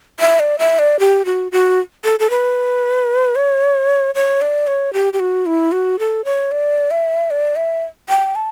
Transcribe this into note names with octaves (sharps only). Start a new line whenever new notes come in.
E5
D5
E5
D5
G4
F#4
F#4
A4
A4
B4
C#5
C#5
D5
C#5
G4
G4
F#4
E4
F#4
A4
C#5
D5
E5
D5
E5
G5
A5